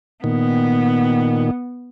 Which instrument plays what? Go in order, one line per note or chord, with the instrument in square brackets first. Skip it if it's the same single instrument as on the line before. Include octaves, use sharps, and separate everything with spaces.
[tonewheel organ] A#2 D#3 [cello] B3